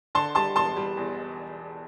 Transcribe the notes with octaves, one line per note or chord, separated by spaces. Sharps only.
D3 A5 C6
G3 A5 C6
E1 A5 C6
G3
E2